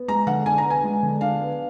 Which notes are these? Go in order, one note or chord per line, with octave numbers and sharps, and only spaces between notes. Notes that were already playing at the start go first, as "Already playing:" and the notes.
Already playing: B3
G#3 A#5
D3 F#5
D4 G#5
A#5
B3
G#5
G#3
D3
D4 F5
B3